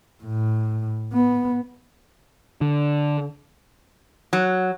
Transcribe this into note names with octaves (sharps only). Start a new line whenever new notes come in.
A2
B3
D3
F#3